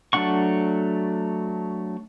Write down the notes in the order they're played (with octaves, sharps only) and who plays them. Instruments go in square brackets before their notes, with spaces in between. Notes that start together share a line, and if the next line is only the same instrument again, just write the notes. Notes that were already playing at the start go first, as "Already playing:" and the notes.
[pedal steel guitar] F#3 A3 D4 F#5 C#6